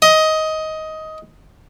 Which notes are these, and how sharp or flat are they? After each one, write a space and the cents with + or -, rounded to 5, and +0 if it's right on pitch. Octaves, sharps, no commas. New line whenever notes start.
D#5 +15